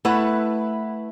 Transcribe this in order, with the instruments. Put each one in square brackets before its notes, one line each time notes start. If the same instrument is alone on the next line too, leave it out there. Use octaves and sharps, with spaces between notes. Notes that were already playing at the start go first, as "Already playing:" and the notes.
[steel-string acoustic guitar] A3 E4 B4 F#5